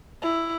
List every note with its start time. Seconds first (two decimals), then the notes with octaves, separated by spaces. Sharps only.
0.22 E4